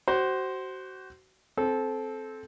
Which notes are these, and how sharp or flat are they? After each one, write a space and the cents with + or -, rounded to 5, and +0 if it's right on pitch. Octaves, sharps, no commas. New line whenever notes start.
F#4 +30 C5 +0
C4 +0 A4 -20